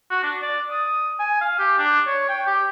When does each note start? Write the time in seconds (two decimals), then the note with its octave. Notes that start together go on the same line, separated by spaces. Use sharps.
0.10 F#4
0.23 D4
0.42 D5
0.71 D#6
1.19 G#5
1.41 F5
1.59 G4
1.78 D4
2.07 C#5
2.29 G5
2.47 G4